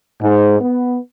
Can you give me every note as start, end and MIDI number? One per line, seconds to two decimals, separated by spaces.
0.21 0.58 44
0.60 0.97 59